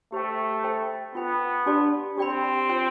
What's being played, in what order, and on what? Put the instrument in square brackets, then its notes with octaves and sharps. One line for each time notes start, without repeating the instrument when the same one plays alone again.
[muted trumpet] A3 [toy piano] G4 C5 G5
[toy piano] A4 C5 G5 B5
[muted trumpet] B3 [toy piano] F4 C5 G5 B5
[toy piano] D4 G4 D5 A5 C6
[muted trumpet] C4 [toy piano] G4 D5 G5 B5
[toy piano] F4 C5 G5 C6